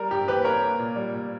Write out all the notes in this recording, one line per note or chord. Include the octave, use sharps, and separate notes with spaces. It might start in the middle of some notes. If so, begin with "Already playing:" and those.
Already playing: G3 A#4
G2 G4
E3 G4 B4
A#3 A#4 C#5
A#3
A#2
G3
A#2